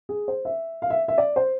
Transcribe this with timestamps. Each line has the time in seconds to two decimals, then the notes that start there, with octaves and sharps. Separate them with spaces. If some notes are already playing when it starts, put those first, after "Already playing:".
0.09 G#4
0.28 C5
0.45 E5
0.82 F5
0.90 E5
1.08 E5
1.18 D5
1.36 C5